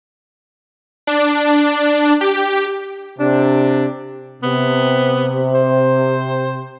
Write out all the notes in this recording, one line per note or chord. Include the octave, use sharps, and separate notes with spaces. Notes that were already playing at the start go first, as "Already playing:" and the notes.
D4
G4
C3 D4
C3 B3
C5